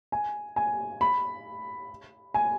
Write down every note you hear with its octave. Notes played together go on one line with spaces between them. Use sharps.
G#5
G#5
B5
G#5